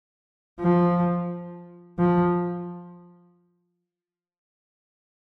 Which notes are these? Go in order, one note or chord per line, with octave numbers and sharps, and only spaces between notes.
F3
F3